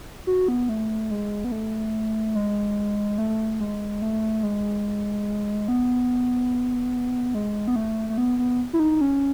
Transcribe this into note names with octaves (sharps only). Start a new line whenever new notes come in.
F#4
B3
A3
G#3
B3
A3
G#3
A3
G#3
A3
G#3
B3
G#3
B3
A3
A3
B3
B3
E4
D#4
C#4